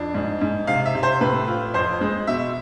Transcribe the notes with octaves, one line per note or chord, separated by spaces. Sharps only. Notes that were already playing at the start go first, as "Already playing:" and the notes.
Already playing: F2 D4
G#2
G#2
C3 F5
E5
C3
C5
A2 B4
F4
F2 C5
G#3
B2 E5